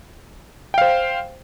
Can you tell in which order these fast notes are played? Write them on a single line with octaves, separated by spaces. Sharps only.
G5 F5 C5